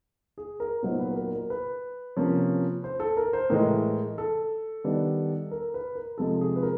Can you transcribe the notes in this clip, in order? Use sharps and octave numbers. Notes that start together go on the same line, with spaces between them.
G#4
A#4
A#2 F#3 B3 D#4 C5
B4
B4
A#4
A#4
B4
C3 F3 A#3 C#4
C5
A4
A#4
C5
A2 E3 G#3 A#4
A4
D#3 G3 B3 D4
A#4
B4
A#4
C3 F3 G#3 A4
G#4
B4
A#4